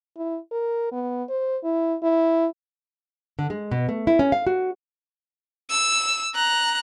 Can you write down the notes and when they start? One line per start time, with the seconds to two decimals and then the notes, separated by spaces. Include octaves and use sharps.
0.18 E4
0.52 A#4
0.92 B3
1.29 C5
1.64 E4
2.03 E4
3.39 D3
3.50 G#3
3.71 B2
3.89 A3
4.07 E4
4.19 C#4
4.32 F5
4.47 F#4
5.70 E6
6.35 A#5 F#6